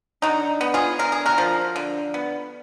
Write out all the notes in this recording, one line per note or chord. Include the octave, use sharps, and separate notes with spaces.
D3 D#4 F#4
B3
F4 G#4
D3 A#4
G#4
F#4 A#4
F3
D3
B3